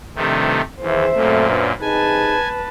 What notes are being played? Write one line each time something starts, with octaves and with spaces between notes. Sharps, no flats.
G2 C3 D#3 F3 A3
D#2 E3 G#4 C5 E5
F#2 A#2 A3 C4
F#3 D4 B4
C3 D#4 G#4 B4 G#5 A5